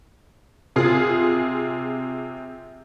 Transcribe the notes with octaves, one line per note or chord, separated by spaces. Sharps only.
C3 F4 G#4